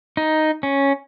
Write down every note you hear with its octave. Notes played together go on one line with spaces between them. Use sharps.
D#4
C#4